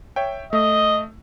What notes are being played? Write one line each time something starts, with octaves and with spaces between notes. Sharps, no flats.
C#5 E5 G5
A3 D#5